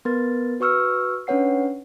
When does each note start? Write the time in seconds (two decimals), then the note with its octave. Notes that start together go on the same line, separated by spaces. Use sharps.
0.05 B3 A#4 B4 A6
0.60 F#4 B4 C#6 E6 F6 C#7
1.27 C#4 D4 B4 C#5 F#5 C7